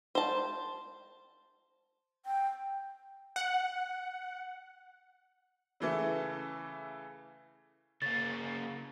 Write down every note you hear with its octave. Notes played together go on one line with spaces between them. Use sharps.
C5 A5
G5
F#5
C#3 E3 A3
C#3 A#3 A6